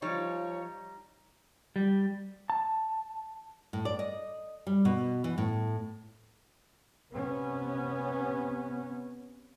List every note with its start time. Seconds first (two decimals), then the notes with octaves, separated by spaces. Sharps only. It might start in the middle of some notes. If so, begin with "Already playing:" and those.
0.02 F3 G3 D#4 C#5
1.76 G3
2.50 A5
3.73 A2
3.85 D5
3.99 D#5
4.67 G3
4.85 B2
5.24 E3
5.38 A2
7.12 C3 B3 C#4